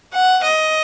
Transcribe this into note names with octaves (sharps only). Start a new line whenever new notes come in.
F#5
D#5